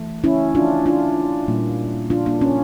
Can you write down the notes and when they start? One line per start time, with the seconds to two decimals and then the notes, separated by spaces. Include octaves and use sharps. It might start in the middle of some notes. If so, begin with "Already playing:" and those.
Already playing: E3 A3
0.24 C#4 E4
0.55 D4 F4
0.86 D4 F4
1.48 A#2 G3 A#3
2.10 D4 F4
2.26 A#3 D4
2.41 C#4